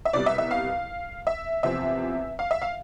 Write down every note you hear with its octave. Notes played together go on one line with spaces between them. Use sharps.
E5
C2 B2 G3 D5
E5
E5
F5
E5
E2 C3 F3 C4 E5
F5
E5
F5